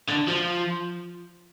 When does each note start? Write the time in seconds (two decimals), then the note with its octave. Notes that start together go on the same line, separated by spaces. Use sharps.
0.08 D3
0.27 F3